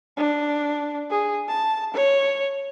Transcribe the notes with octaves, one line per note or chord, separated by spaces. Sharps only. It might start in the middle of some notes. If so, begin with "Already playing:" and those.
D4
G#4
A5
C#5